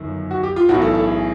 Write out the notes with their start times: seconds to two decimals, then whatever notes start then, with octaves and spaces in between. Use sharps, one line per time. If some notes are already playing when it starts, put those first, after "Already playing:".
Already playing: G1 F#2 D#3
0.31 F#4
0.43 G4
0.56 F4
0.69 B1 A2 E3 F#4
0.82 A4
0.95 A4
1.07 G#4